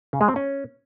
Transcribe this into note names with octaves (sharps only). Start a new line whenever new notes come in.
C#3
G#3
C4
C#4